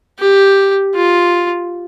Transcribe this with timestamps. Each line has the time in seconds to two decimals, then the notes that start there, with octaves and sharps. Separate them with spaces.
0.19 G4
0.95 F4